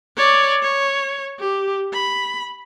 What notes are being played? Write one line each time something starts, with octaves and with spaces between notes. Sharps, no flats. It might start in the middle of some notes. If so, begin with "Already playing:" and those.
C#5 D5
C#5
G4
B5